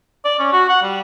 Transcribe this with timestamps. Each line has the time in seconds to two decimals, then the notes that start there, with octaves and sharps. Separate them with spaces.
0.25 D5
0.39 C#4
0.53 F#4
0.70 F#5
0.83 G3